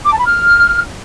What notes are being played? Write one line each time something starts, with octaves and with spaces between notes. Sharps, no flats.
D6
A5
B5
F6